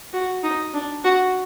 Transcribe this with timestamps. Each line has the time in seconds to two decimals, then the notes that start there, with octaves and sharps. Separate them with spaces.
0.13 F#4
0.43 D#4
0.74 D4
1.04 F#4